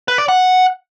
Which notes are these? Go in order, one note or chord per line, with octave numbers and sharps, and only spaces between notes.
B4
D5
F#5